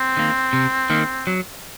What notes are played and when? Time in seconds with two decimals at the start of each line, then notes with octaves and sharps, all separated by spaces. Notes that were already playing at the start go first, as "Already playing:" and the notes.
Already playing: C4
0.17 D#3 A#3
0.53 C3
0.90 D#3 A#3
1.27 F#3